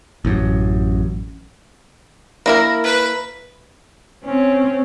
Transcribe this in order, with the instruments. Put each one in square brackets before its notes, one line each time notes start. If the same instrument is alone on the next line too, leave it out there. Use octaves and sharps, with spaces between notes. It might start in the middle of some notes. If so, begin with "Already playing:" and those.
[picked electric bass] A1 F#2
[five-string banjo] A#3 E4 A#4
[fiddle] B4
[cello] C4 C#4